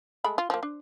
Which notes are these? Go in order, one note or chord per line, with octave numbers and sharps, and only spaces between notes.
G#3 A3 B5
F4
F3 A#3
D4